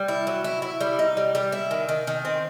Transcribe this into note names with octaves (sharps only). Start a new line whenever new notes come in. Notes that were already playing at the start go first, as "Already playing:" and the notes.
Already playing: G3
E4
F#3
E4
E4
G3
D#4
G3
G3
E4
D#3
D#3
D#3
C4